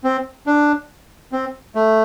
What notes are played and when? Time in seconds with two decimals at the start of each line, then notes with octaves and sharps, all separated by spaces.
0.04 C4
0.47 D4
1.32 C4
1.75 A3